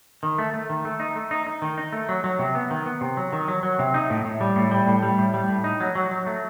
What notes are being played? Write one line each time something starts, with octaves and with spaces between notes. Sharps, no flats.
D#3
A3
A3
D#3
A3
D#4
A3
D#4
D#4
D#3
D#4
A3
F#3
F#3
C3
B3
D#3
B3
C3
F#3
D#3
F#3
F#3
C3
D#4
A2
A2
G3
A2
G3
A2
G3
A2
G3
A2
D#4
F#3
F#3
F#3
A3